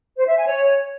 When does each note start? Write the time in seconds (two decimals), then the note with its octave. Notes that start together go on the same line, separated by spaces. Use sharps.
0.16 C5
0.26 E5
0.36 G#5
0.46 C#5